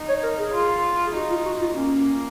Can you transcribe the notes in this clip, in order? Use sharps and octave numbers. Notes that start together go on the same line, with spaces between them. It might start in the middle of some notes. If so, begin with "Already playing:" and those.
Already playing: D#4
C#5
A#4
G#4
F4
G#4
D#4 F#4
F4
F#4
F4
A#3 C#4